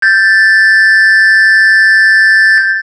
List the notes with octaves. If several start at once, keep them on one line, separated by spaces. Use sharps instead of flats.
G6 A6